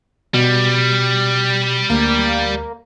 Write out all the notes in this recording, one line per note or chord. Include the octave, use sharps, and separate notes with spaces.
B2 G3
D2 A#3